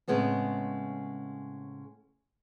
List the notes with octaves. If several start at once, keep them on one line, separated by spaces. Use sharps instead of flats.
A2 C#3 G#3 B3 C4